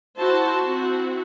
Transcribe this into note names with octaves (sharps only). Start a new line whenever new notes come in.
E4 F#4 C5 A5
C4 E4 F#4